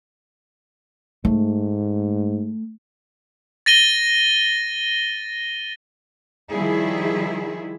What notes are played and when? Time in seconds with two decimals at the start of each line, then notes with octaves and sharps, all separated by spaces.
1.25 G#2 A3
3.66 A6 A#6 D#7 G7
6.50 D#3 F3 G3 E4 G#4